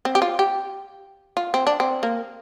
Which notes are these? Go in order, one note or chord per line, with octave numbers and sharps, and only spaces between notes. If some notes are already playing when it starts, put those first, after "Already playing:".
C4
G4
F4
G4
F4
C4
D4
C4
A#3